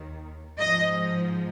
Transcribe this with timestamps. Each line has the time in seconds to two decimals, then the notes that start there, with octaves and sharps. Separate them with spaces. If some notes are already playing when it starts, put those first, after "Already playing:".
Already playing: D#2 D#3
0.58 G#2 F3 D#5